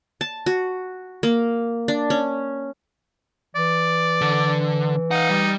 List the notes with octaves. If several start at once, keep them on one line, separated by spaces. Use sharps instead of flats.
A5
F#4
A#3
D4
C#4
E3 D5
D3
D#4 F5 F#5
G3